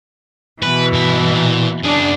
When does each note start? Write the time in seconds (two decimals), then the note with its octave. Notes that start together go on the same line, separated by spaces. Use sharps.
0.63 B2 E3 B4
0.93 G2 E5
1.34 A#2
1.84 F#2 D4 G#4